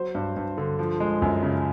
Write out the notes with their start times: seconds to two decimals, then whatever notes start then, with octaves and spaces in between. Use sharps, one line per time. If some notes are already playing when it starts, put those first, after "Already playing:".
Already playing: F#3 C5
0.15 G2
0.36 G2
0.58 D3
0.79 F3
1.00 G#3
1.22 F#2
1.43 C#3